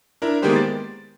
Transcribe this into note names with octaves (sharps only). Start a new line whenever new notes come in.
D4 E4 A#4
D#3 G#3 A#3 B3 G4 C5
A6